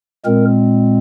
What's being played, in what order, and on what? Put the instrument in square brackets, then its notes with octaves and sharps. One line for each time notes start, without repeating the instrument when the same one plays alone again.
[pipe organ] A#2 G#3 C4 A#4